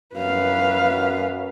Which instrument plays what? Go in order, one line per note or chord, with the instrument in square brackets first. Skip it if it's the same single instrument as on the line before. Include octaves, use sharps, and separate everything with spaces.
[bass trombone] F#2 [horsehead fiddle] B4 F5